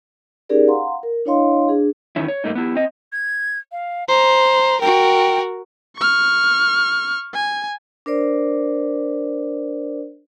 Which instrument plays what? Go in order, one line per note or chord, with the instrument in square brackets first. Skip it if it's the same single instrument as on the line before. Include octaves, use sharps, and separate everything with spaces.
[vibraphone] C#4 D#4 G4 G#4 A#4 D5
F5 F#5 A#5 C6
A#4
D4 E4 C#5 D#5 F5 C6
D4 G#4
[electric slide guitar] E2 D#3 C#4 E4
C#5
G2 A3 A#3 D#4
B3 E4 G4
C4 D#5
[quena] G#6
F5
[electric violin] C5 [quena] A#5
[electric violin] F#4 A#4 [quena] G5
[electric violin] C#6 F6
G#5
[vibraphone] D4 A#4 C5 D5